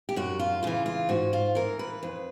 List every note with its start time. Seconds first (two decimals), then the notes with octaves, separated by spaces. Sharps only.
0.09 G4
0.16 F#2 F#4
0.39 F4
0.63 C#3 E3 F4
0.86 F4
1.09 G#2 F#4
1.33 F4
1.55 E3 A#4
1.79 B4
2.03 F2